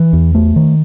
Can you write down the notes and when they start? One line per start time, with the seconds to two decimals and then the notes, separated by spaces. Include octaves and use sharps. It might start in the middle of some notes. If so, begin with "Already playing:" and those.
Already playing: E3
0.13 E2
0.35 A3
0.56 D#3